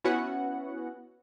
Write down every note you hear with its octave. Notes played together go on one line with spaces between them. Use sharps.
B3 C#4 E4 F#4 B4 F#5